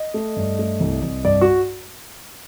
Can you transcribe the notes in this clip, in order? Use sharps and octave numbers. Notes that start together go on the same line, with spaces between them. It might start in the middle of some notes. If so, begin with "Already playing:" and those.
Already playing: D#5
A3
G2
A3
C2
C2
G2 D5
F#4